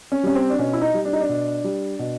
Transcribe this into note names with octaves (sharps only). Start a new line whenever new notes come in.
C#4
G3 C#4
C4
D4
B2 C#4
E4
D#4
G3
D4
D#4
D4
B2
G3
B2